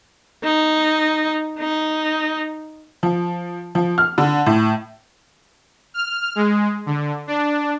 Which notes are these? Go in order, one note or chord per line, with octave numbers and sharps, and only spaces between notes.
D#4
D#4
F3
F3
F6
D3
A2
F6
G#3
D3
D4